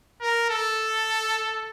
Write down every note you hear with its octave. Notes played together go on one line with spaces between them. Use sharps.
A#4
A4